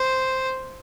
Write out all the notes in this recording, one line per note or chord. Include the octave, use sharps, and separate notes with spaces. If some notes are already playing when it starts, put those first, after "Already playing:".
Already playing: C5